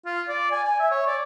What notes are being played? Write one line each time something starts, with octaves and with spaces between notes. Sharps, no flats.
F4
D5
G#5
G#5
E5
C#5
D5